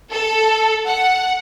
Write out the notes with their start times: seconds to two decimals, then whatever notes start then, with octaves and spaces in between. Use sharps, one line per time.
0.10 A4
0.86 F#5